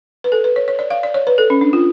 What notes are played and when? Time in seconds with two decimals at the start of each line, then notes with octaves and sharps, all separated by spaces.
0.24 B4
0.32 A4
0.44 B4
0.56 C#5
0.68 C#5
0.79 D5
0.90 F5
1.03 D5
1.14 C#5
1.27 B4
1.38 A4
1.50 C#4
1.61 D4
1.73 F4